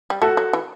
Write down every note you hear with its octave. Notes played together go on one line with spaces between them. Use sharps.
G3
A3 F#4 A4
F#3
E3